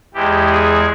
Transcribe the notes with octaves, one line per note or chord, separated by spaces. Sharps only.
E2 E3 G#3 G4
G#4